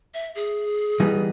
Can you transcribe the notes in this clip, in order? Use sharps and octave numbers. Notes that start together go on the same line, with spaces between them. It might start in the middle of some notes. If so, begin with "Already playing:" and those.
E5
G#4
E3 G3 B3 D#4